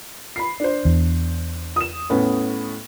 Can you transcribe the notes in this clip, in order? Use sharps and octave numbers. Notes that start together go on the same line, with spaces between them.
B5 C7
D4 C5
E2
D#6 E7
A2 B3 C#4